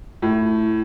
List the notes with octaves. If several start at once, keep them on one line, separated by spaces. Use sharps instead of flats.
A2